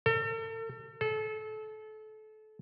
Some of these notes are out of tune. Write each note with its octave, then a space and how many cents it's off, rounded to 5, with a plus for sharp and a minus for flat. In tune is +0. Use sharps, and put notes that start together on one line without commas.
A4 +40
A4 -30